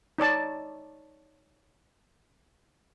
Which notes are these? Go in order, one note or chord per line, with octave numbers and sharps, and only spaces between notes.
D#4 C#5 D5 A5